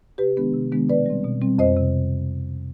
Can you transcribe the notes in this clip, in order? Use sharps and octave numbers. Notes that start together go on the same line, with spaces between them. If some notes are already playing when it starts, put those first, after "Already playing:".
C3 G4 B4
D#3 G#3 B3 D4
C3
D#3 G#3 B3 D4
B2 B4 D5
G3 C4
B2
G3 C4
F2 C5 D#5
C3